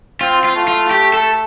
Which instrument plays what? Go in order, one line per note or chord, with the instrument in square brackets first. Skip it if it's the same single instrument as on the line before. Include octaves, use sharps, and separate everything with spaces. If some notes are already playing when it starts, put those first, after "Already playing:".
[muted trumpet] C4 [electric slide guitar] F4
[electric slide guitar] F4
[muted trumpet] A3
[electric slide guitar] F4
G4
A4